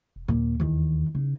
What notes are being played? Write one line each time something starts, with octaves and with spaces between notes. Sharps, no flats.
E1
D#2 A#2
E2 D#3
C#3 D#4